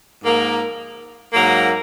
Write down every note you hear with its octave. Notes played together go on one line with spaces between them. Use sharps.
G#2 F3 A#3
G#2 F#3 A#3